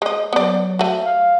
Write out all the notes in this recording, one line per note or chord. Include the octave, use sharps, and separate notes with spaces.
G#3 D#5
F#3 B3 D5
A3 F#4
F5